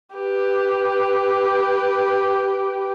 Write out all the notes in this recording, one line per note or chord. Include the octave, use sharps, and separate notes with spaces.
G4 B4